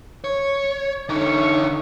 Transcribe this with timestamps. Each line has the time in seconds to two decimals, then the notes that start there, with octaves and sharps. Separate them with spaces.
0.24 C#5
1.09 D3 D#4 C#5 E5 C#6